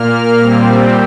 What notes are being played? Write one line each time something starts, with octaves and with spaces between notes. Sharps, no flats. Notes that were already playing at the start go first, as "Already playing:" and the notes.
Already playing: A#2 A#3 F6
A#2 G3 C4